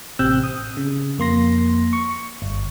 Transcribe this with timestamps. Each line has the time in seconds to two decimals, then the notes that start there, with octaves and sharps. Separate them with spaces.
0.19 A1 C3 C4 E6 F#6 G6
0.43 D#6
0.77 C#3
1.18 F2 A#3 C6 A#6
1.93 C#6
2.42 G1